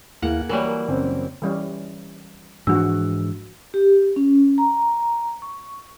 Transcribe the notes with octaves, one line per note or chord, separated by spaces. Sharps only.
D#2 A#3 B3 E4 G#4 F5 F#5
E3 F#3 G3 A#3 A#4 G#5
F#1 C4
E3 G3 C#4
G#2 E3 F3 G#3 D4 F#4 E6
G4
C#4
A#5
C#6